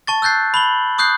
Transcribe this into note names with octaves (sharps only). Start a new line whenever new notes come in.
A5 C#6 A6
E6 F#6 G6 A6 C7
B5 F#7 G7
C#6 D#6 F#6 G6 C7